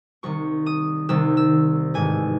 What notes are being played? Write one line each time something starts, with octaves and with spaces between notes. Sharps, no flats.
C2 C3 D#3 C#6
D#6
C2 C3 D#3 E6
E6
A1 G#2 D#3 G#5